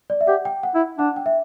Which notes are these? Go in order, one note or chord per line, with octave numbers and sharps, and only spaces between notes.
D5
E5
G4 F#5
G5
F#5
E4
D4 F#5
G5
E5